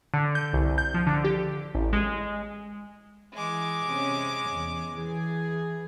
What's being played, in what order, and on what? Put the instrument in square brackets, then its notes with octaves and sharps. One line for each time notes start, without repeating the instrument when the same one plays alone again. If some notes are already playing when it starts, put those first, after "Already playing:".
[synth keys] D3
G6
C2
G6
F3
D3
G4
A1
G#3
[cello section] E3 [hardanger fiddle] G#3 D6
[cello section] C3 C#4
E2
E3 G#4